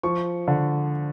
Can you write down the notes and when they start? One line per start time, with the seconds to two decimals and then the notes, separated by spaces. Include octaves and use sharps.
0.03 F3 C#6
0.48 D3